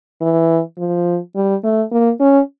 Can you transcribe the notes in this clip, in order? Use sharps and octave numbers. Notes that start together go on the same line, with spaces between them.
E3
F3
G3
A3
A#3
C#4